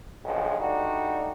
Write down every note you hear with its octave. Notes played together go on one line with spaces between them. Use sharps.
B1 G2 D3 F3 G#3
G3 A3 D4 D#4 F#4